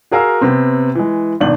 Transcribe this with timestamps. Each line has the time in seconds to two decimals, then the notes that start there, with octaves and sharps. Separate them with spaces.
0.11 F#4 G#4 A#4 F5 A#5 E6
0.41 C3 B3 C4
0.95 E3 G#3
1.40 G#1 B2 D4 F#7